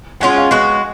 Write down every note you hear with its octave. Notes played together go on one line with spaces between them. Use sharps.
G#3 C#4 F4 F#5
F5
G#3 B3 F#4 F#5